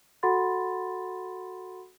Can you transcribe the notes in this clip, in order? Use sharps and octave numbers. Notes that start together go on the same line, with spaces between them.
F#4 A4 F#5 B5 C6 A6